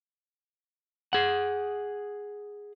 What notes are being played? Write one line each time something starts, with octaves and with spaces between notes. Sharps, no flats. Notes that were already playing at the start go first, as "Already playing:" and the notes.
G#4 F#5